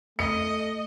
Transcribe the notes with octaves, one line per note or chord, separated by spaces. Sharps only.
A3 D#5 C#7